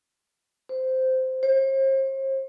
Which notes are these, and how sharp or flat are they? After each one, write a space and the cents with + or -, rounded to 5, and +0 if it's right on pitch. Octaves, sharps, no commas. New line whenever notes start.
C5 -10
C5 +40